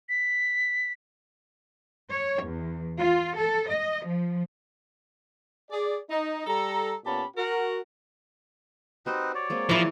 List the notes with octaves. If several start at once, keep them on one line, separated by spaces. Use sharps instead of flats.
B6
C#5
E2
F4
A4
D#5
F3
G#4 D5
D#4
G3 A4 A#5
A#2 B3 C#4 G4 A5 B5
F#4 A#4
C4 D#4 F#4 G4 B4 C5
C#5 D5
G#3 A#3 C4
E3 F3 E4